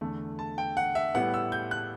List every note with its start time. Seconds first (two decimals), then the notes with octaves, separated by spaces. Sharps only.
0.01 E2 D3 A3
0.39 A5
0.58 G5
0.77 F#5
0.95 E5
1.15 A2 G3 B3 E4 F#5
1.34 E6
1.52 G6
1.71 F#6